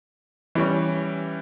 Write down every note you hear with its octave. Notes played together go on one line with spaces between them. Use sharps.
E3 G3 C#4